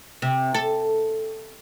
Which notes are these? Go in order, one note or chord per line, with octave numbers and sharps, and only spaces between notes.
C3
A4